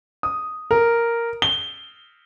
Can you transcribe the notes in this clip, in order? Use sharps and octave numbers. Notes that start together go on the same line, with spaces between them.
D#6
A#4
G7